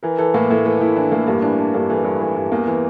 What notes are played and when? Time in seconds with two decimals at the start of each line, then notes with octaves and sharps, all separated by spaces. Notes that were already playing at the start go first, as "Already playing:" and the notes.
0.03 E3 A#4
0.18 E3 A4
0.34 A2 A#3
0.50 A2 A3
0.65 E3 A3
0.81 A2 E4
0.96 E3 D4
1.12 A2 A#3
1.27 G2 A#3
1.42 E3 D4
1.58 E3 D4
1.74 G2 A#3
1.89 E3 A3
2.04 G2
2.20 E3
2.36 G2
2.51 E2 A#3
2.67 E3